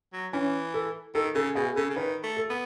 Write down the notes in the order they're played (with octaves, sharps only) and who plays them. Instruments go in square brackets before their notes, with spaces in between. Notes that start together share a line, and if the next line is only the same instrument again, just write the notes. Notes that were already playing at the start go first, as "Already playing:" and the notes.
[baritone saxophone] F#3
[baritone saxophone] E3 [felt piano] C#4
[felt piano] A4
[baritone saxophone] D#3 [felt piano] A4
[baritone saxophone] C#3 [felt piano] A4
[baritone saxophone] B2 [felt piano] G#4
[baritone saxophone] C#3 [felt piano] A4
[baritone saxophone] C#3
[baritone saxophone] D#3 [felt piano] B4
[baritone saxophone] A3
[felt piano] A4
[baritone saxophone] B3